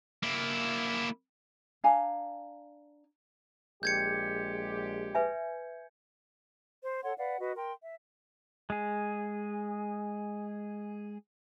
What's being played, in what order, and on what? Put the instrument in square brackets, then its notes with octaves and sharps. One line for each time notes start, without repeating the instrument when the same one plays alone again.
[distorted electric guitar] A#3 E4
[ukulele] D4 F5 G#5 A#5
[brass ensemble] A#1 G#3 G4 [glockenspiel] G6 G#6 C#7
[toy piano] B4 E5 G#5
[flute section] C5
A4 C#5 F#5 C6
B4 D5 F5 F#5
F#4 B4 D#5
A#4 G5 C6
E5
[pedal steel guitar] G#3 G#4